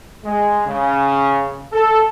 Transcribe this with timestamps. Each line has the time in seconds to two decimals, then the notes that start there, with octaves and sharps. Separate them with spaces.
0.24 G#3
0.66 C#3
1.72 A4